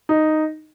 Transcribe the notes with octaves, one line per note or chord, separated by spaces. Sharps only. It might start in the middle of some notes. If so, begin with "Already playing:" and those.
D#4